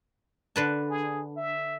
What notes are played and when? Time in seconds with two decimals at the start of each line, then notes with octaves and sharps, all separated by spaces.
0.56 D3 B4 A5
0.89 G#4
1.37 E5